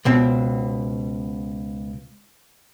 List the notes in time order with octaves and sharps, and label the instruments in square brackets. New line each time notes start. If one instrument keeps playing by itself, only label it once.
[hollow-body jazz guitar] C#2 B2 C4